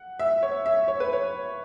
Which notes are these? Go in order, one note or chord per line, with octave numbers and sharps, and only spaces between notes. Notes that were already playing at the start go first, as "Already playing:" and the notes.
Already playing: F#5
E5
C#5
E5
C#5
B4
C#5